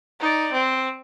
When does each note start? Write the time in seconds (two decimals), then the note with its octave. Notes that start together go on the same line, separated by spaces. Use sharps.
0.20 D#4 D5
0.52 C4